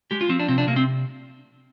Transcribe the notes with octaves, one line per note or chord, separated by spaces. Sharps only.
G#3 G4
F4
F3 C4
D4
C3 C4
D4
C3 A#3
C4